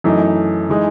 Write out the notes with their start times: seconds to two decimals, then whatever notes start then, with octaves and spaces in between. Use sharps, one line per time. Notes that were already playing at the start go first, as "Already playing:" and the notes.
0.04 F#2 E3 A3 D#4
0.69 E3 G#3 D#4